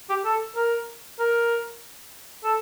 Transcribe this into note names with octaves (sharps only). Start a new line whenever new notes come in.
G4
A4
A#4
A#4
A4